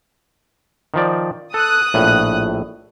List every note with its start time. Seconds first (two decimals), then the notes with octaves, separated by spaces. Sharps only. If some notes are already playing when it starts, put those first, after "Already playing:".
0.94 D#3 F3 D5
1.54 A4 D#6 F#6
1.94 A#1 A2